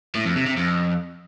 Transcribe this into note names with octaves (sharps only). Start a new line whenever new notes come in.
A2
F2
C3
C3
F2